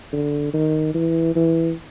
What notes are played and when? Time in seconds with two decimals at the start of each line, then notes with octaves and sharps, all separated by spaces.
0.13 D3
0.54 D#3
0.95 E3
1.36 E3